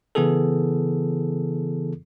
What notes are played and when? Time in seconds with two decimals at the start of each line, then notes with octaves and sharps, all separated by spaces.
0.15 C#3 E3 B3 E4 G#4 A4